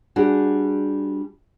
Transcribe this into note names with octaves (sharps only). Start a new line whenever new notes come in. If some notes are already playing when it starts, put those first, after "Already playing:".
G3 D4 F#4 G#4